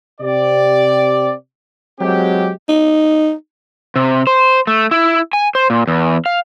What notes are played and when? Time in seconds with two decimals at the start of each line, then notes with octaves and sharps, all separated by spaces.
0.21 C3 C4 G4 D5
2.01 F#3 G#3 C4 G4
2.69 D#4
3.96 C3
4.27 C5
4.67 A3
4.91 E4
5.33 G#5
5.55 C5
5.70 A#2
5.87 E2
6.26 F5